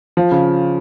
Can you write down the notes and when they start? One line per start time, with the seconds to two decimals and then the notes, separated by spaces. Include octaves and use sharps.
0.17 F3
0.31 C#3